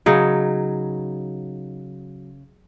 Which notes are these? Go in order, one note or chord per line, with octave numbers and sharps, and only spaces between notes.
C#3 F#3 D#4